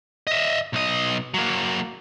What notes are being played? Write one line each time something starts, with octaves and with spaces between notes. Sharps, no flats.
D#5 E5
B1 D#5
F#3 A#3